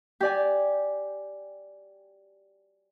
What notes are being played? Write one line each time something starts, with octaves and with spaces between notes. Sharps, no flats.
G4 D5 G#5